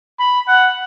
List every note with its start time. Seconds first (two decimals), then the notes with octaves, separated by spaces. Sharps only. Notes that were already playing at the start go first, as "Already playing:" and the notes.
0.19 B5
0.48 F#5